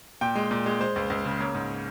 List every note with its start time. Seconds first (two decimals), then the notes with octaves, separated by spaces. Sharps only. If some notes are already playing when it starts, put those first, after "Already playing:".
0.21 A#2 G5
0.35 G#3
0.51 A#2
0.66 G#3
0.80 G#3 C5
0.96 C#2
1.10 C#2
1.25 C#3
1.40 A#3 C#5
1.54 G#2